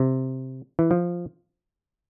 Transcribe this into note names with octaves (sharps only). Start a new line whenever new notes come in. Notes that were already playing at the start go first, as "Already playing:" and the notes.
Already playing: C3
E3
F3